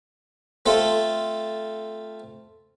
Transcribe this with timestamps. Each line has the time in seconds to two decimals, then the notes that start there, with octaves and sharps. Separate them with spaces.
0.66 A3 C4 F4 A4